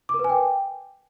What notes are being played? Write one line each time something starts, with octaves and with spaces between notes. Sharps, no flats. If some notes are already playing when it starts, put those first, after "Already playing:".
D6
A#4
B4
G#5
G5